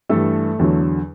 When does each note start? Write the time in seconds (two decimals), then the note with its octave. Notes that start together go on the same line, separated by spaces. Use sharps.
0.09 G2 E3 A3 A4
0.59 E2 D3 F#3